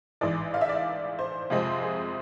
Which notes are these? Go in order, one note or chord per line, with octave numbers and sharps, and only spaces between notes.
A1 G#2 E3 D5
F5
E5
D5
E5
C5
F2 C3 G#3 C4 F4
G#4